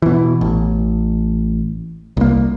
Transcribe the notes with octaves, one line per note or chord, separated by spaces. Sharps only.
B2 E3
A1
C2 A#3